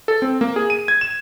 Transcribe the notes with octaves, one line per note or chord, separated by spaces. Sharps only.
A4
C4
A#3
G#4
D#7
G#6
E7